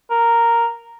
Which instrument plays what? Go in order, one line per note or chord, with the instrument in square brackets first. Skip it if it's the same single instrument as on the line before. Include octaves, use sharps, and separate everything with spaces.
[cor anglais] A#4